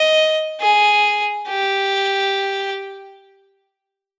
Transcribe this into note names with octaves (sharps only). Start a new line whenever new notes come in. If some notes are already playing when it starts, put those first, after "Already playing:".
Already playing: D#5
G#4
G4